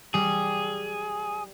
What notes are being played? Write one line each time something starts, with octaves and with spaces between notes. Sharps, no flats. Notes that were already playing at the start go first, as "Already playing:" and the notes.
G3 G#4